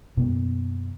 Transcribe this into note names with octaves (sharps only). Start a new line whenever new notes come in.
F#2 B2 A#3 B3